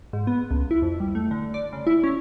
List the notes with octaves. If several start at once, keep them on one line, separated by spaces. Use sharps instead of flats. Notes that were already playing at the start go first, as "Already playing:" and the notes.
G#2
B3
C#2
E4
F2
G3
A3
D3
D5
C#3
E4
C#4